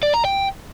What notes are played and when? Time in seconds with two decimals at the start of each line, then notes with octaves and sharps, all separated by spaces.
0.03 D5
0.14 A#5
0.25 G5